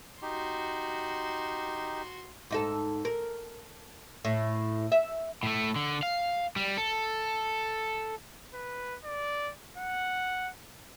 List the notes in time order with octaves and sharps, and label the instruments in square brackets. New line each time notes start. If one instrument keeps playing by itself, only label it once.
[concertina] D#4 G4 [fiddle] F#4 C6
[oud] G#2 D#4 A4
A#4
A2
E5
[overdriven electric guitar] A2 A3
D3
F5
G3
A4
[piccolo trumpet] B4
D5
F#5